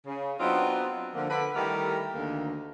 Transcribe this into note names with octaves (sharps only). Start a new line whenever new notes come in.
C#3
F#3 B3 C4 D4 D#4 F4
D3 F3 A#3
D3 B4
D#3 G3 A3 E4 G4 A#4
D2 D#3 A#3